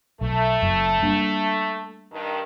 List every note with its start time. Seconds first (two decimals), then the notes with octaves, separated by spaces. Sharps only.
0.21 B1 A3
0.62 F#1 F#2
1.02 G3 A#3 D4
2.12 G2 D#3